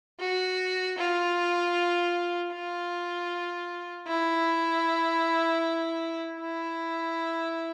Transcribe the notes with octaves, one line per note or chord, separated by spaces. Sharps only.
F#4
F4
F4
E4
E4